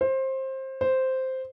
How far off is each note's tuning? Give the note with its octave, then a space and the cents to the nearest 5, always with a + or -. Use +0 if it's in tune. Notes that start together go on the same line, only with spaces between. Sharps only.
C5 +20
C5 -5